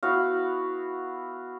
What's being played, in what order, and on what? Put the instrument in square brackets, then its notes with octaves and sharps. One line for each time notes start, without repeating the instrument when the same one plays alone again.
[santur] B3 E4 F#4 F5